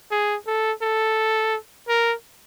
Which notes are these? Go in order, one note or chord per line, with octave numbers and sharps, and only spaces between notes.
G#4
A4
A4
A#4